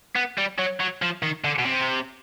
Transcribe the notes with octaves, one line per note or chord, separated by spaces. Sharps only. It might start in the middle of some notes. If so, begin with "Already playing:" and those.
B3
G3
F#3
F#3
F3
D#3
D3
B2
C3